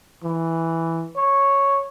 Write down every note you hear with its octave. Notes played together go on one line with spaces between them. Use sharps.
E3
C#5